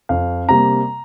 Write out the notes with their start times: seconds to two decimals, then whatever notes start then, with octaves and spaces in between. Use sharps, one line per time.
0.09 F2 F5
0.49 C3 G3 A#3 A#5